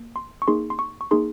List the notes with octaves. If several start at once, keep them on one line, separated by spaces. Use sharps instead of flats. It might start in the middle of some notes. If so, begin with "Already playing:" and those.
Already playing: A#3
C6
C#6
A#3 D#4 G#4 C6
C6
C#6
C#6
A#3 D#4 G#4 C6